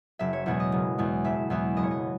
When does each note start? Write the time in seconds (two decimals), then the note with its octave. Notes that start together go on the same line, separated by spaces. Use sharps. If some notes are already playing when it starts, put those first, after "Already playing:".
0.19 F#1 E5
0.33 C#5
0.46 E2 B2 G#3 C#5
0.60 D#5
0.72 F#1
0.98 E2 B2 G#3
1.24 F#1 E5
1.50 E2 B2 G#3 B3 E5
1.77 F#1 D#5
1.84 C#5
1.91 D#5